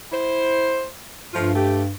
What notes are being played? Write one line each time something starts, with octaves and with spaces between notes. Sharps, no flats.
E4 C5
G2 F3 A3 F4
A3 G4